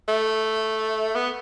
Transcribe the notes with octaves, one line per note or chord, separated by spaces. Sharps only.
A3
B3